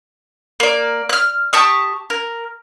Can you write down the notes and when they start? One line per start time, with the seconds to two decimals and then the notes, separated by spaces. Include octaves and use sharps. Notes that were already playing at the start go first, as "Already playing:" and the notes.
0.60 A#3 D5
1.09 F6 F#6
1.53 G4 A5 C#6 D#6
2.10 A#4